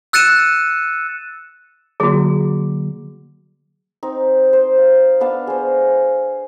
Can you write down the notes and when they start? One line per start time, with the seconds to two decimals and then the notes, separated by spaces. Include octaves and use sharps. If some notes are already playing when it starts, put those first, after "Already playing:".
0.13 E6 F#6 A6 C#7 D#7 E7
2.00 D3 F#3 A#3 F#4 G#4
4.03 C4 D#4
4.53 C5
4.78 F5
5.20 B3 D4 F5 A5
5.47 G#4 C5